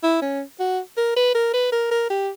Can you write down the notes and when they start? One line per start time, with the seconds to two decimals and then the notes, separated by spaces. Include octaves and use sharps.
0.03 E4
0.22 C#4
0.60 F#4
0.97 A#4
1.16 B4
1.35 A#4
1.53 B4
1.72 A#4
1.91 A#4
2.10 G4